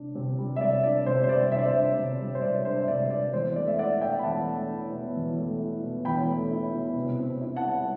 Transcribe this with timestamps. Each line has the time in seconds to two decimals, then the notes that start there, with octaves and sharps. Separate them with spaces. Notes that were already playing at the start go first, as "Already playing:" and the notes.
Already playing: C3 D4
0.15 C3
0.39 G3
0.56 E5
0.61 C3 D5
0.83 D4 D5
1.06 C3 C5
1.23 C5
1.29 G3 D5
1.51 C3 E5
1.59 D5
1.66 C5 E5
1.74 D4
1.97 C3
2.20 G3
2.35 C5
2.42 C3 D5
2.65 D4 C5
2.79 E5
2.87 C3 D5
3.10 G3 D5
3.33 E2 C5
3.56 A3 D5
3.67 E5
3.79 E4 D5 F#5
4.01 B2 E5 G5
4.19 B5
4.24 E2 F#5 A5
4.46 A3
4.69 E4
4.92 B2
5.15 E2
5.38 A3
5.60 E4
5.83 B2
6.05 E2 G5 B5
6.28 A3
6.51 E4
6.73 B2
6.96 C3
7.19 C4
7.41 E4
7.56 F#5 A5
7.64 G3